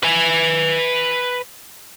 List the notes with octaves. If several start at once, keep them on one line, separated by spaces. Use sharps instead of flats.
B4 G#5